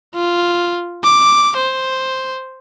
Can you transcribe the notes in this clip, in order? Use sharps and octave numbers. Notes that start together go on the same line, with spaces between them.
F4
D6
C5